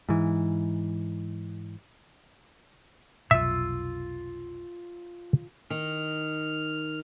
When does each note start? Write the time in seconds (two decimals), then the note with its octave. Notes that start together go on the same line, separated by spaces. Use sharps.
0.09 G#2 E3
3.31 F1 B1 F4 E5 E6
5.70 D#3 F6